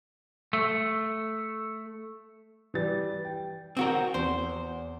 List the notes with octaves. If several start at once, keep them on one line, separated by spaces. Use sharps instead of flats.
A3
E3 G3 A6
G5
C4 F#4 A#4
E2 C5